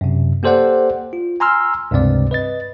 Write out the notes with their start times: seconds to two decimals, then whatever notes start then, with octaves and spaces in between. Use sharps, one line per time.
0.01 F#2 C3
0.43 A#3 G4 A4 C5 D5 F#5
1.13 F4
1.40 G#5 A#5 C6 E6 F6
1.91 C#2 G2 C3 C4 D5
2.31 B4 D#5 A6